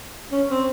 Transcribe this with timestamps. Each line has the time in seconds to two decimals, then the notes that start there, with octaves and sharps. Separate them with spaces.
0.32 C#4
0.50 C4